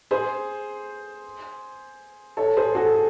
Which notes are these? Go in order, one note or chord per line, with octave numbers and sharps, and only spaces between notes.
G#4 C5
A4 C#5
G#4 C5
F#4 A4
G#4